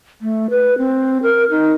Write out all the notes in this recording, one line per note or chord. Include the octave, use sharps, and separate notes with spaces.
A3
B4
C4
A#4
D#4